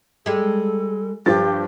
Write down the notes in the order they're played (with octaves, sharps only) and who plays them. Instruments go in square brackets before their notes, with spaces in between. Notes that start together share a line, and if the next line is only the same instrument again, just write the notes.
[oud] G3 G#3 [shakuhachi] A4
[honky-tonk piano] G2 F3 A6 [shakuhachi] G4